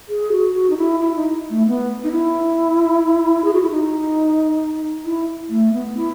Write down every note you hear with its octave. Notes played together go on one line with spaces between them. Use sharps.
G#4
F#4
F#4
D#4
E4
E4
D#4
A3
B3
D#4
E4
G#4
F#4
E4
D#4
E4
A3
B3
E4